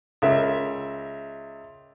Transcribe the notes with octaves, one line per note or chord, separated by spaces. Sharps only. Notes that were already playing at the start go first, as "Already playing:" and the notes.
C#2 A#4 E5